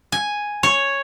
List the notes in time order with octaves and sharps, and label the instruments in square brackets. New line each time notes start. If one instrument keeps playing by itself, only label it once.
[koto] G#5
C#5